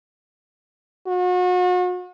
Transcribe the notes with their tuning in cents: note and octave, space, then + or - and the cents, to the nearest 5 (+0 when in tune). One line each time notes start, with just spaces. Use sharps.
F#4 -40